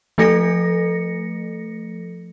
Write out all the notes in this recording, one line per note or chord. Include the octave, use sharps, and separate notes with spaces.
F3 A3 A4 A#6 C#7